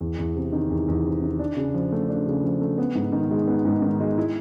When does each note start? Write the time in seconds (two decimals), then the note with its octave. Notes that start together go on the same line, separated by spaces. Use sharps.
0.01 E2
0.18 E2
0.36 C3
0.53 D#3
0.70 E2
0.88 E2
1.05 C3
1.22 D#3
1.39 D4
1.57 C#3
1.74 F3
1.92 A3
2.09 D4
2.27 C#3
2.44 F3
2.61 A3
2.78 B3
2.95 G#2
3.12 D#3
3.31 G#3
3.47 B3
3.65 G#2
3.82 D#3
4.00 G#3
4.18 E4